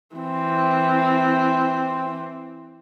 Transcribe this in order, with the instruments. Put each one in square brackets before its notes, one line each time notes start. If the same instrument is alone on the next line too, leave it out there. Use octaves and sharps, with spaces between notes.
[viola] E3 C4